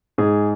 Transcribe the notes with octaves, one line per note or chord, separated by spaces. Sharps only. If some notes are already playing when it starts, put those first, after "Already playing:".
G#2 G#4